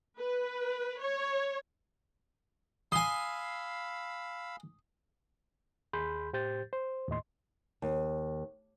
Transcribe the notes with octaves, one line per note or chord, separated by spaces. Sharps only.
B4
C#5
F5 G#5 B5 C6 D#6 E6
D#2 G#4 B5 C6 G6
A2 G4 C5 G6 A6
C5
D#2 A2 D#5 C6
D#2